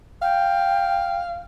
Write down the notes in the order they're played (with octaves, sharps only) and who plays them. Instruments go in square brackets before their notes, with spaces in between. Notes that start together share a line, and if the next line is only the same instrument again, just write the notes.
[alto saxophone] F5 [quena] G5